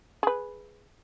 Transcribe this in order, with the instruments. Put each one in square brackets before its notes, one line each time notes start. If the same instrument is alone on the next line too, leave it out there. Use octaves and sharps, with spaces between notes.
[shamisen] G#4 B4